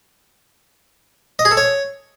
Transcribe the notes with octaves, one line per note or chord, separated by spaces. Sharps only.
D#5
G#4
A4
C#5